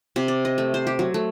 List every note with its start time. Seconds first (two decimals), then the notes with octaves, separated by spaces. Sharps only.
0.16 C3
0.28 D5
0.45 D#5
0.58 A3
0.74 C5
0.87 G4
0.99 F#3
1.14 A3